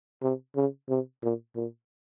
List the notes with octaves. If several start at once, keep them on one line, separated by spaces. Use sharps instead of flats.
C3
C#3
C3
A#2
A#2